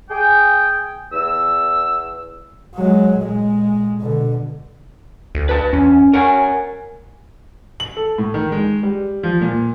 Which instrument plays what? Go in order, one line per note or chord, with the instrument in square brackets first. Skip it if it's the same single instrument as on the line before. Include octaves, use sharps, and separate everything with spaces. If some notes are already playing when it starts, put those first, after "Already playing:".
[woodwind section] G#4 G5
E2 E6
[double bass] F#3 G#3
A#2 G#3
B2 D3
[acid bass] D2
[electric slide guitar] B4 A5
[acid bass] E2 [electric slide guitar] C#4
[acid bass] C#4 [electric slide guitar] A#4 F#5 G#5
[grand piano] F#7
A4
A2
D#3
G#3
G3
F3
A#2